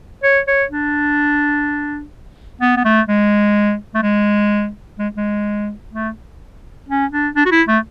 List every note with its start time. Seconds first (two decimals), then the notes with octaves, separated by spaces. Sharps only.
0.23 C#5
0.48 C#5
0.70 D4
2.61 B3
2.77 B3
2.85 A3
3.08 G#3
3.94 A3
4.03 G#3
4.99 G#3
5.17 G#3
5.93 A3
6.89 C#4
7.12 D4
7.36 D4
7.45 F#4
7.51 E4
7.68 A3